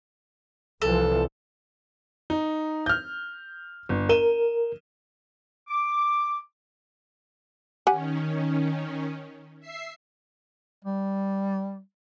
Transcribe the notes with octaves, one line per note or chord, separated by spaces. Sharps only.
C2 E3 F3 A4
D#4
F6 G6
G1
A#4 D#7 E7 G7
D6
D#3 C#4 G4 F#5 G#5
E5 C7
G3